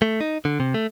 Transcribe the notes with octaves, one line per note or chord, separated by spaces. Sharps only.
A3
D#4
D3
C3
A3